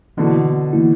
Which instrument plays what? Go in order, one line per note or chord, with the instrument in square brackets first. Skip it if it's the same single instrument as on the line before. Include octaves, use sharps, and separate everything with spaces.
[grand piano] B2 D3 [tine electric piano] E3 A#3 E4
[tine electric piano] E3 A#3 E4